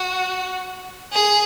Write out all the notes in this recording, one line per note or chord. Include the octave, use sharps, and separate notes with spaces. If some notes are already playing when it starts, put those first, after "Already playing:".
Already playing: F#4
G#4